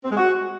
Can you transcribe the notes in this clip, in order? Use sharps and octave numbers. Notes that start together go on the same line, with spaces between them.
C4
G#3
F#4